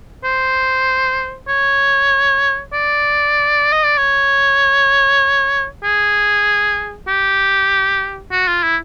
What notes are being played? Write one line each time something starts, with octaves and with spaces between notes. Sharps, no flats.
C5
C#5
D5
D#5
D5
C#5
G#4
G4
F#4
F4
E4